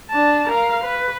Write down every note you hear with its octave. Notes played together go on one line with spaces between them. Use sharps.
D4 A5
A#4 F5
B4